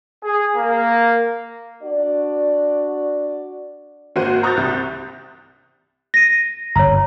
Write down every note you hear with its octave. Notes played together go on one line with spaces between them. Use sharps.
G#4
A#3
D4 F#4 D5
G#1 A#3 F#4 C5 D#7
A#5 C#6 D#6 F#6 G6 A6
C2 C3
A#6 D#7
G1 C#5 A#5